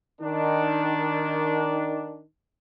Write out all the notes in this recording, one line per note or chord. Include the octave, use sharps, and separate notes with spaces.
D#3 D4